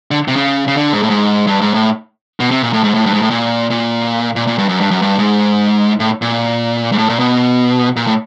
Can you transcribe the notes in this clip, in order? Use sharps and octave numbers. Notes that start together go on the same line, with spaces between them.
D3
C3
C#3
C#3
D3
G#2
A2
G#2
G2
G#2
A2
B2
C3
A#2
A2
G#2
A2
G2
G#2
A2
A#2
A#2
A#2
A#2
G2
F#2
G2
F#2
G2
G#2
A2
A#2
G#2
A2
A#2
B2
A#2
A2